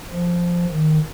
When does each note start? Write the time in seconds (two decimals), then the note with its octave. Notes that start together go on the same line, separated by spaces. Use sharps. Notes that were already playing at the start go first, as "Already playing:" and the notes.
0.10 F3
0.71 D#3